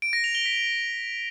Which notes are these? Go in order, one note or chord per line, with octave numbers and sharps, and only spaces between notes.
D7
A#6
F7
G7
B6